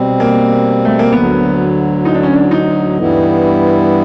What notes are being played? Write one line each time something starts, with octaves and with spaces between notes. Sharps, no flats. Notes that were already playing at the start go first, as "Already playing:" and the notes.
Already playing: B2 G3 C4
A#3
A3
A#3
D2 D3 F#3 B3
D#4
D4
C#4
D4
D#4
G2 E3 G3 B3 E4